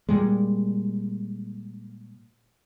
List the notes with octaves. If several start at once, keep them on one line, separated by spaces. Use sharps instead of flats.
A#2 G3 G#3